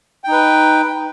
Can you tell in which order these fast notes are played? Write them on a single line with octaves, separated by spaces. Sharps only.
G5 D#4 B4